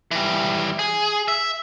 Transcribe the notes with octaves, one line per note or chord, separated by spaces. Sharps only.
E3 G3
G#4
E5